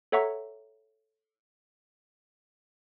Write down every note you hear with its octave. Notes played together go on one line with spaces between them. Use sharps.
A4 C#5 E5 F#5 A#5 C#6